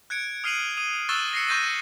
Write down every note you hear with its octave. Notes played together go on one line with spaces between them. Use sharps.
F#6 G#6 C#7 D7
D#6 F6 C7 D#7 F7 F#7
D#6 D#7
C#6 E6 F#6 A6 E7 G7
A#6 C7 C#7
C#6 F#6 G6 A6 A#6 D#7